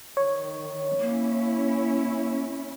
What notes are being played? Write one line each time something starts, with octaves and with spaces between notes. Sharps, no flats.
D#3 C#5
A#3 C#4 E4